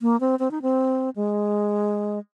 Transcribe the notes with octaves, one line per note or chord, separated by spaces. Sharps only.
A#3
C4
C4
D#4
C4
G#3